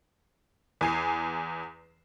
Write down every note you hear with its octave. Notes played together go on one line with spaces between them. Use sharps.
E2 G#5 C7